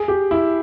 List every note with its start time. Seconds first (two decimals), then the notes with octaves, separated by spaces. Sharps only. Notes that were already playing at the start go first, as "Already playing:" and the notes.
Already playing: G#4
0.08 G4
0.31 E4